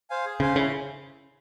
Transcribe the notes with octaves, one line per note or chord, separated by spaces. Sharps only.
C5 F5 G#5
G#4
C#3 C5 F5 G#5
C#3 E4